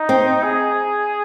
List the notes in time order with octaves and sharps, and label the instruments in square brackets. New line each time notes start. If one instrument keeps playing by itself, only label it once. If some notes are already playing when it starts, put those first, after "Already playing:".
Already playing: [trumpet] D#4
[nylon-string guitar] C4
[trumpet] G#4